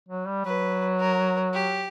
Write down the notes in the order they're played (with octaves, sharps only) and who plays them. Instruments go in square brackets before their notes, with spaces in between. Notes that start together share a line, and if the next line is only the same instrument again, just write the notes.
[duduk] F#3
G3
[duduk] F#3 [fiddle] B4
[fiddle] A#4
G4